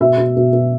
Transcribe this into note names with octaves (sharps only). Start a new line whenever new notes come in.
B2 E5
B2
B2
B2